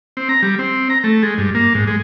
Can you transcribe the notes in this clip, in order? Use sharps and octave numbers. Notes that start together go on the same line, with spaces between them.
C4
A#5
G3
C4
A#5
A3
G#3
G2
A#3
G#2
G#3